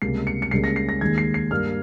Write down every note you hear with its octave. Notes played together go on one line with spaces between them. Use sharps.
C#2 C3 G3 A#3 C7
C#7
C#7
C#2 C#3 G3 A#3 C7
A#6
C7
A#6
D#2 D#3 G#3 G#6
C7
C7
G2 G3 A#3 F6